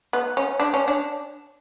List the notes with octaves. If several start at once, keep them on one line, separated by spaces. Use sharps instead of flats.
B3
C#4
D4
C#4
D4